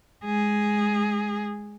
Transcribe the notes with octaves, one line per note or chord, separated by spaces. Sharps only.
G#3 G#4